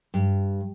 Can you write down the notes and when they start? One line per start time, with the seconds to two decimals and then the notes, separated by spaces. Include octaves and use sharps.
0.14 G2